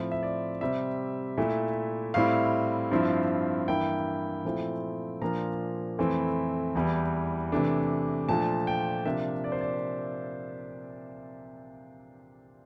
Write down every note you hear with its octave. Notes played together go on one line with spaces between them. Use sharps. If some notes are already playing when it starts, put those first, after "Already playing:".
Already playing: A2 F3 C4 E4 E5
E5
D5
C3 G3 C4 E5
A#2 A3 E4
A2 G3 C4 E4 F5
G2 F3 C4 E4
G2 E3 A#3 E4 G5
A#2 F3 A3 C4 E4
A#2 F3 A#3 D4 A#5
F2 E3 A3 C4 E4
E2 E3 G3
C3 E3 A3 D4
A#2 F3 A3 D4 A5
G5
C3 F3 A#3 D4 E5
D5
C5
D5